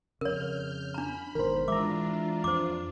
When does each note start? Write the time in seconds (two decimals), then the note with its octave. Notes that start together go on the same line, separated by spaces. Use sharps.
0.21 F2 C#3 A#4 C#5 F6 G6
0.94 D4 A#5 B5
1.35 G#1 B2 D#3 A#4 C5
1.68 E3 G#3 D4 F4 E5 A#5 D6
2.44 F2 C5 D6